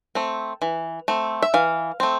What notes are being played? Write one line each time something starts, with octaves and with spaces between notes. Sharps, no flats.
A3 C4
E3
A3 C4
E5
E3 F5
A3 C4